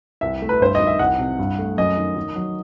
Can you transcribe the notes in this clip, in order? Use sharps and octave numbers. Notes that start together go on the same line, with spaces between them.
C2 E5
A3
B4
G2 C5
D#5
D#3
E5
C2 F#5
C3
G2
A3
F#2 D#5
D#3
D#3
F#3